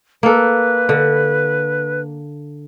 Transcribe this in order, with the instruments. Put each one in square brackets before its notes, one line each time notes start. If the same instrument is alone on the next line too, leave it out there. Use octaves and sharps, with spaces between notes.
[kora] A#3 A4 [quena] B4
[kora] D3